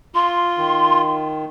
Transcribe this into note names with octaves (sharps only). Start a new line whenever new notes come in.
F4 C6
D#3